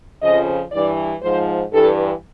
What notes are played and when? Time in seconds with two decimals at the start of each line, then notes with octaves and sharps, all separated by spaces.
0.22 F2 C#3 F3 D#5
0.72 G2 E3 D5
1.22 G#2 F3 C5
1.73 G2 E3 A4